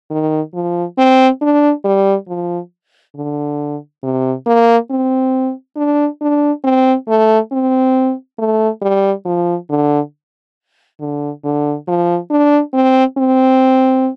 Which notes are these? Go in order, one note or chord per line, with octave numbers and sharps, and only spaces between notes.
D#3
F3
C4
D4
G3
F3
D3
C3
A#3
C4
D4
D4
C4
A3
C4
A3
G3
F3
D3
D3
D3
F3
D4
C4
C4